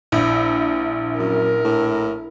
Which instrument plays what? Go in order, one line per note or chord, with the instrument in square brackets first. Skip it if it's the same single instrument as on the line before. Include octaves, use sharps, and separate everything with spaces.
[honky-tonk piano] A#1 [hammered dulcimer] E4
[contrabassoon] F#2 [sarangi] A#4
[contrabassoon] A2